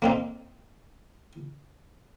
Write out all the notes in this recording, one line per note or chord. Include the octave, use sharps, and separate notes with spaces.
A#3 C4 D#4